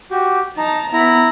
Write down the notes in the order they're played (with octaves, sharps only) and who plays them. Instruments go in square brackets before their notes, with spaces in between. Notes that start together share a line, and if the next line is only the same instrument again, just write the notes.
[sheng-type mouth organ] F#4 G4
[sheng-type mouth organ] D#4 [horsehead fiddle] A5 A#5
[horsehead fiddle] B3 B5 [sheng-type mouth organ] E4 A#5